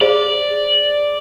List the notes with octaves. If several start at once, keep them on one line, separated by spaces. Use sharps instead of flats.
G#4 C5 D5 F5